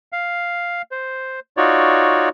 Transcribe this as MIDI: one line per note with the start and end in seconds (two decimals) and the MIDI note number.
0.13 0.82 77
0.92 1.40 72
1.57 2.29 63
1.57 2.29 65
1.57 2.29 66
1.57 2.29 73
1.57 2.29 74